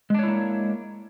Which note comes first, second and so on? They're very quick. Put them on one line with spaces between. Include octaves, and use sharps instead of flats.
G#3 D4 C#5 E4 A#3